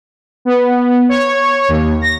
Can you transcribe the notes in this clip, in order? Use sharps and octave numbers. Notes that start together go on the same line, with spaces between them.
B3
C#5
D#2
A#6